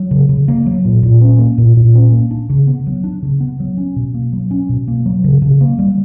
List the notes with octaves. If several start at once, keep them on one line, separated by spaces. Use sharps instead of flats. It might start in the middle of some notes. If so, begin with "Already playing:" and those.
Already playing: F#3
C#3
C#3
A#3
F#3
A#2
A#2
C#4
A#3
A#2
A#2
C#4
A#3
D4
C#3
B3
F#3
D4
C#3
B3
F#3
C#4
B2
A#3
F#3
C#4
B2
A#3
F#3
C#3
C#3
A#3
G3